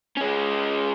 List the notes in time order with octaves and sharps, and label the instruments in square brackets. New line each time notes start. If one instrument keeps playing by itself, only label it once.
[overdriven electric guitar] G#3 C#4